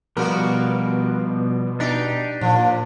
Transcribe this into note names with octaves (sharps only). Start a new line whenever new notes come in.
B2 F3 G3 A#3 B3 F#4 A#4
D4 D#4 G4
A#2 F3